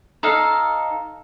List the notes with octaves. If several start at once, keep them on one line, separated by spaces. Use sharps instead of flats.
D#4 A4 F5